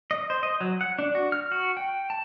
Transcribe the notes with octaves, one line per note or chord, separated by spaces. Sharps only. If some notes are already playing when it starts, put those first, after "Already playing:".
D#5
C5
D#5
F#3
F#5
D4
F#4
F6
F#4
G5
A5